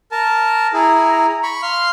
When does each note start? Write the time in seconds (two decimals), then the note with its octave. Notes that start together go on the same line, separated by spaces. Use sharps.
0.12 A#4 A5
0.73 E4 G#4 A#5
1.43 B5 C#6
1.63 F5 C6 F6